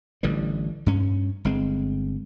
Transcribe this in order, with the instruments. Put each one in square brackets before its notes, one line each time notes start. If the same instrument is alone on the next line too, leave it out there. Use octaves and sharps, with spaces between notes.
[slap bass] A1 D3 E3 G3
G2 C#4
G1 G#3 C4